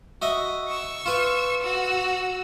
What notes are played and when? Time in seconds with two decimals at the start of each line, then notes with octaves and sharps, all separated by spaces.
0.22 F#4 D#5 E5
0.68 C#6 E6
1.06 F4 B4
1.62 F#4 E6